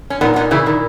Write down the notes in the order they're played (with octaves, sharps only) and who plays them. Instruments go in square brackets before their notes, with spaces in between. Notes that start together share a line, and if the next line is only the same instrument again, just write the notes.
[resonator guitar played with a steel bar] C#4
[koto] A#2 [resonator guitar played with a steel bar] B3 D#4
[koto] A#2 [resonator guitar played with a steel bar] B3 D#4
[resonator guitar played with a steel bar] C#3 E3 [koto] E4
[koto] A#2 [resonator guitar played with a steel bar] D#3